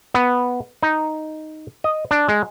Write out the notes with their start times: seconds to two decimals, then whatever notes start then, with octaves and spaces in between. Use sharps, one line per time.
0.14 B3
0.83 D#4
1.84 D#5
2.11 D4
2.29 G#3